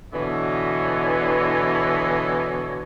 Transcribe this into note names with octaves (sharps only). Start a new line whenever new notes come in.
B2 D3 E3 C#5 D#5